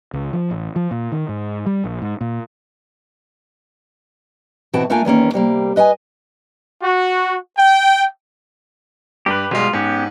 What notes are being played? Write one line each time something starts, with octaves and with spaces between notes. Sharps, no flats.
C#2
F3
A1
F3
A#2
D#3
G#2
G3
A#1
G#2
A#2
B2 E3 C4 F#4 G5 A5
A3 A#3 D4 F4 G5 G#5
E2 D#3 A#3 C#4
C3 G3 A#3
B4 D#5 F#5 G#5
F#4
G5
G2 G4 B4
B1 G3 G#3 F4
G#2 B3 C#4 G4